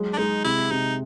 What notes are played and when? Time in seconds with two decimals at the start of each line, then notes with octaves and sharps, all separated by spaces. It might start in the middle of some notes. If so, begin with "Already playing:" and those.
Already playing: F#3 G#3
0.14 D4
0.18 G#3 D#4
0.45 C3 E4
0.71 C3 D#4